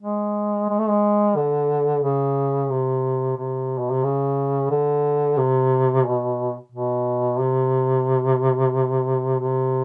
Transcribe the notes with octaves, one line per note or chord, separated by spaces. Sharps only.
G#3
G#3
A3
G#3
D3
C#3
C3
C3
B2
C3
C#3
D3
C3
B2
B2
C3
C3